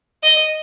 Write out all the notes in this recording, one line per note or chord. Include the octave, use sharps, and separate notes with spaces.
D#5